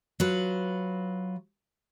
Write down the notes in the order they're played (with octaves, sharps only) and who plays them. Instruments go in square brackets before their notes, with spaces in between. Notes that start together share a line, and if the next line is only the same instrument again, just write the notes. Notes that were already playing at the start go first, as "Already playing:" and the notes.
[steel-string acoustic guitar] F#3 F4 B4